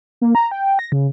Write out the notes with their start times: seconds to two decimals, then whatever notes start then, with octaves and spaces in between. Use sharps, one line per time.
0.21 A#3
0.35 A#5
0.51 G5
0.79 A#6
0.92 C#3